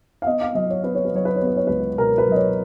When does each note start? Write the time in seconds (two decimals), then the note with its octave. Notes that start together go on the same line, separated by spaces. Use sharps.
0.22 F5
0.26 B3 D#5
0.41 F5
0.55 F#3 D#5
0.70 C#5
0.84 B3 B4
0.95 C#5
1.05 B4
1.12 F#3 C#5
1.25 B4
1.36 C#5
1.41 B3
1.47 B4
1.56 C#5
1.67 C#2 B4
1.98 B2 A#4
2.18 B4
2.27 F#3
2.32 D#5
2.36 C#5